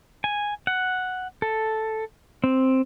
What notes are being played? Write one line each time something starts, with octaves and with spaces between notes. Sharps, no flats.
G#5
F#5
A4
C4